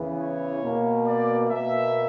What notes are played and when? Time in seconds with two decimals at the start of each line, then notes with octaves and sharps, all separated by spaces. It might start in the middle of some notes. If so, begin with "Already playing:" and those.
Already playing: E2 C#3 E3 B3
0.20 C#5
0.63 B2 A#3
1.07 D5
1.50 B2 A#3 E5